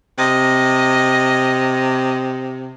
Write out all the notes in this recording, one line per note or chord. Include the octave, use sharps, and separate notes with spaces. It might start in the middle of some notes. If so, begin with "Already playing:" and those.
C3 D#5